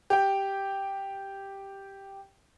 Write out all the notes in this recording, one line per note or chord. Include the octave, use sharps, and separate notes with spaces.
G4 G5